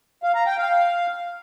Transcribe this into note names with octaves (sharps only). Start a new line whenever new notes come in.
F5
A#5
G5
F5